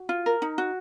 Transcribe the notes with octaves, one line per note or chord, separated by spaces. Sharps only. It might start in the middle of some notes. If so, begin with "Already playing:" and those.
Already playing: F#4
F4
A#4
D#4
F#4